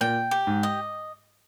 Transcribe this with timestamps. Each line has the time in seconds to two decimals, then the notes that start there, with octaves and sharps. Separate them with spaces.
0.01 A#2 G5
0.31 G4
0.47 G#2
0.63 D#5